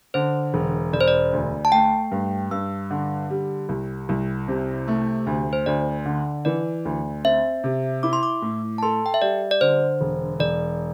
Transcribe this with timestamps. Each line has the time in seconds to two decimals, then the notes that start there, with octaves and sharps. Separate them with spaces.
0.14 D3 C5
0.54 E1
0.93 E1 D5
1.00 C5
1.08 D5
1.33 D2
1.65 A5
1.72 A3 G5
2.11 G2
2.51 G2 E6
2.90 D3
3.30 G3
3.69 C2
4.09 C2
4.48 C3
4.88 A3
5.27 D2
5.53 C5
5.66 D2 D5
6.05 D3
6.45 E3 D5
6.85 D2
7.24 C4 E5
7.64 C3
8.03 E4 D6
8.13 C6
8.23 D6
8.42 A2
8.78 A5
8.82 A4 C6
9.06 G5
9.14 E5
9.22 G3 D5
9.51 D5
9.61 D3 C5
10.01 E1
10.40 E1 D5